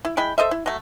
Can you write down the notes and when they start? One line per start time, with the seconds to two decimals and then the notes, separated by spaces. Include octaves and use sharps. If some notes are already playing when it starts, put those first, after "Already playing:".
0.05 E4
0.17 G#3 E4 G5 B5
0.38 A4 C5 D#5 E5
0.51 E4
0.66 F#3 A3